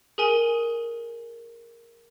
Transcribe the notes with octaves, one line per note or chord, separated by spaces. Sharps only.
G#4 A#4 G#5 D#7 G7